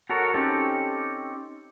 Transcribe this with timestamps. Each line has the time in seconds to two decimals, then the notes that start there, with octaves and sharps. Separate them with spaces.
0.10 F#4 A4 A#4 C#5
0.34 C4 C#4 D#4 G4 A4